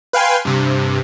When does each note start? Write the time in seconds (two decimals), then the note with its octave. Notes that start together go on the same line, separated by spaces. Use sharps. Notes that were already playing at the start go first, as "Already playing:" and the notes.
0.13 B4 F5 G5 G#5 C6
0.45 G2 C3